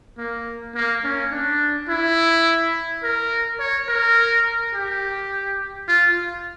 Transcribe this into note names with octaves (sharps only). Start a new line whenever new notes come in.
A#3
A#3
C#4
D4
E4
A#4
C#5
A#4
G4
F4